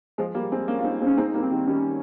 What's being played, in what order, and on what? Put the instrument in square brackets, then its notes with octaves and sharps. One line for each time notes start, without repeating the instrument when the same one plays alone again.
[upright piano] F3 G#3
G3 A#3
G#3 C4
A#3 C#4
F4
C4 D#4
G#3 C4
[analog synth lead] C#4
[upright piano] G#3 C4 [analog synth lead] D#4
[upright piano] G3 A#3
[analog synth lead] C4
[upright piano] D#3 G3
[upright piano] D#3 G3 [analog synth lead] C#4